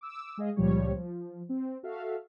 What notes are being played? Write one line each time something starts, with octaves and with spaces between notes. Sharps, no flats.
D6 E6
G#3 G#4 D#5 F5
C#2 A#2 F3 G3 C#5
F3
C4
F#4 A4 E5 F5